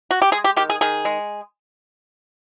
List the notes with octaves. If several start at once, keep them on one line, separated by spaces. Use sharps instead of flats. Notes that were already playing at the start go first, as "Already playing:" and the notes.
F#4
G4
G#3 G#4
G4
D#3 G4
G#4
D#3 G#4
G#3